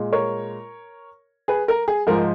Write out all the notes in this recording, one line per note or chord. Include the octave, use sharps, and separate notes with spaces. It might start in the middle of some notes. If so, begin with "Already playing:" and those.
Already playing: A#2 G#3
A#4 C#5
G#4 B4
A#4
G#4
G#2 F3 G#3 A#4